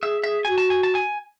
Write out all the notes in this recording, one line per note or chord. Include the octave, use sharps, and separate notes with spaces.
G#4 E5
G#4 E5
F#4 G#5
A5
G#5
A5
G#5